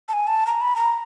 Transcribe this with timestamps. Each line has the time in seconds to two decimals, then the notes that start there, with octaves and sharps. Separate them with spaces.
0.09 A5
0.13 G#5
0.27 A5
0.47 A#5
0.61 B5
0.76 A#5